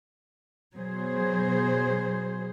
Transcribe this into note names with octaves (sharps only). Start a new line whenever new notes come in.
B2 F#3 G#4 C5